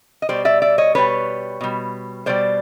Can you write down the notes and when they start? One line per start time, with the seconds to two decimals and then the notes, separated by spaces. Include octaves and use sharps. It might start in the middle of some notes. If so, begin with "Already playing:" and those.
0.22 D#5
0.29 B2 G3 C5 D5
0.45 D5 E5
0.62 D5 E5
0.78 C#5 D#5
0.95 B2 G3 B4 C#5
1.61 B2 G3
2.26 B2 G3 C5 D5